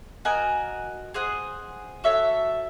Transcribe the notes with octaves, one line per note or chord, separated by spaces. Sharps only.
F#4 A#4 D#5 G#5
G#4 C5 D#5 F#5
F#4 A4 C#5 E5